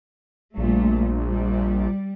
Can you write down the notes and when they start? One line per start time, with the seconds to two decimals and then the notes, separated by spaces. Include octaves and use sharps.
0.58 A#1 A#2 G3 A3
1.30 G3